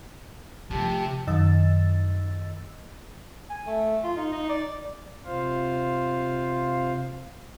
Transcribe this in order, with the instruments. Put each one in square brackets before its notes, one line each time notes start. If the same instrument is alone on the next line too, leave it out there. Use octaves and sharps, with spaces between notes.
[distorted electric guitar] C3 [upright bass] F3 A3 [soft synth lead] G4 [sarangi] A5
[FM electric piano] F#2 D#3 D#5 E6 A6
[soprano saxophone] G#5
A3
F4
D#4
D#4
D5
[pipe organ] C3 F4 C5 F5